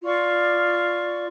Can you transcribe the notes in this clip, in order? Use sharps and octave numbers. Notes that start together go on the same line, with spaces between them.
F4 D5 C#6